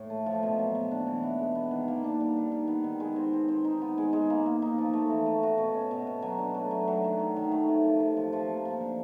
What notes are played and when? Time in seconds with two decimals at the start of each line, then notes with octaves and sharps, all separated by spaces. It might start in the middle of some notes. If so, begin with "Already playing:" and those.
Already playing: A2
0.10 A3
0.26 F3
0.43 B2
0.59 F#3
0.75 B2
0.91 D4
1.07 E3
1.23 B3
1.39 G#3
1.55 B3
1.71 D#3
1.88 A#3
2.04 D4
2.20 G3
2.36 D#3
2.52 D#3
2.68 B3
2.84 D#3
3.00 G#3
3.16 C4
3.33 C4
3.48 C4
3.65 D#4
3.82 B3
3.98 G#3
4.13 G#3
4.30 A#3
4.46 A#3
4.62 D#4
4.78 F3
4.93 A3
5.10 E3
5.26 A3
5.43 F#4
5.58 B2
5.74 C#4
5.91 B2
6.07 B2
6.22 F#3
6.39 D4
6.55 A3
6.71 F#3
6.88 F#3
7.04 D#3
7.19 D#3
7.36 D#3
7.52 A3
7.69 C3
7.84 F3
8.00 C3
8.17 F3
8.33 F3
8.49 A#3
8.65 F3
8.81 D3